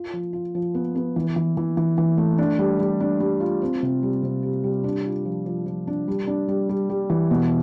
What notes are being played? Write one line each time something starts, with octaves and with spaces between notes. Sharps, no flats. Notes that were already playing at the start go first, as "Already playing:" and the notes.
Already playing: F4
F3
F4
F3
B3
B3
E3
E3
E3
E3
E3
A3
D4
G3
G3
D4
G3
F4
C4
C3
G3
C3
G4
G3
D4
F4
F3
F3
F3
D4
G3
D4
G3
G3
G3
E3
B2